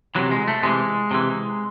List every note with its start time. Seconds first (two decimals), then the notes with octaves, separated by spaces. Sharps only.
0.15 C3 E3 F#3
0.31 G#3
0.48 A3
0.63 C3 E3 G#3
1.11 C3 E3